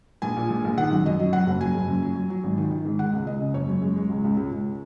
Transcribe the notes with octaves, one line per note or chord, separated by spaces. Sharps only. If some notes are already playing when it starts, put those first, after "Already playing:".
A#1 G#5
A#2
A#1
A#1
D#3 F#5
F#2
F#2 D#5
F#3
F#3 F#5
F#1
F#3 G#5
F#1
F#2
F#3
F#3
F#3
G#1
D#3
D#3
G#2
G#3 F#5
C#2
C#2 D#5
C#3
F#1 C#5
F#2
G#3
G#3
C#2
C#2
C#2
C#2